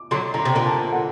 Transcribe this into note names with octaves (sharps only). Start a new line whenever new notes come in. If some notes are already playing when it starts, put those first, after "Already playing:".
Already playing: D6
D3 F#3 C6
D3 A#5
C3
A#2 D3
A5
F#5